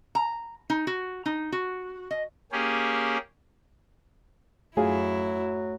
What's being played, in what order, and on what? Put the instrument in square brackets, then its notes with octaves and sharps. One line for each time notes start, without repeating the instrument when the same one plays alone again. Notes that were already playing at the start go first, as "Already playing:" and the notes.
[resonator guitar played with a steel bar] A#5
D#4
F#4
D#4
F#4
D#5
[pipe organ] A#3 C#4 G4 G#4
[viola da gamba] F#2 E4 [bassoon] F#3 [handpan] A3 [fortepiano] F4 G#4